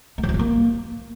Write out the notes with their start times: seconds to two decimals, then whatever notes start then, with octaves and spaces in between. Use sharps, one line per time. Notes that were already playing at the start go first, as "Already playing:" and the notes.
0.18 A3
0.23 F#3
0.29 F3
0.34 G3
0.39 A#3